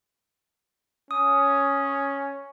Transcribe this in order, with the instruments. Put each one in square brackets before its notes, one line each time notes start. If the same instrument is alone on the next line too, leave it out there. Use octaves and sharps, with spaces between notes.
[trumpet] C#4 [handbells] D#6